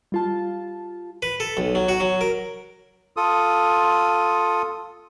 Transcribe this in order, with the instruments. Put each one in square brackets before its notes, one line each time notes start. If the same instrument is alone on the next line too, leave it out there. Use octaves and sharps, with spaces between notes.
[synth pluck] G3 F4 A5
[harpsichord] B4
A4
B1
F#3
F#4
F#3
A#4
[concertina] F4 A4 D#6